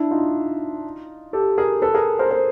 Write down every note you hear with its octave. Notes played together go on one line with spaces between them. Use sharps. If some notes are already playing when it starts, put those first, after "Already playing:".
Already playing: D4 E4
D#4 F4
G4 A4
G#4 A#4
A4 B4
G#4 A#4
A#4 C5
A#4 C5